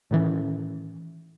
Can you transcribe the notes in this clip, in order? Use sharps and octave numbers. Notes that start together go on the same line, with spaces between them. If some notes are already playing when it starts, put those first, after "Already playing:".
A2 D#3 E3 C#4